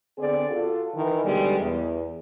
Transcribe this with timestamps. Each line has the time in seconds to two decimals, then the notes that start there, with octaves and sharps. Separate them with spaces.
0.19 D3 B3 C4 G#4 D5
0.51 F4 F#4 A4
0.94 D#3 E3
1.24 B2 D3 D#3 G3 G#3
1.59 E2